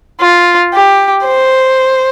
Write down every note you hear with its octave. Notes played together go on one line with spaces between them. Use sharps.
F4
G4
C5